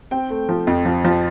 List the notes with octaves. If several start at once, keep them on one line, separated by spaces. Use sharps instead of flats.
C4 G5
A3
F3
F2
F3
F3